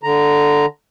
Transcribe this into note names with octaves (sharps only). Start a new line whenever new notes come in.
D3 A#5